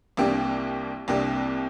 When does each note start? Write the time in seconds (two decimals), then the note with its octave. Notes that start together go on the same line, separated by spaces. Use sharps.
0.17 C2 C3 A#3 D4 G4
1.08 C2 C3 A#3 D4 G4